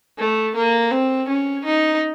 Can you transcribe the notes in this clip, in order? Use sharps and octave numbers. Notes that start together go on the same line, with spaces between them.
A3
A#3
C4
C#4
D#4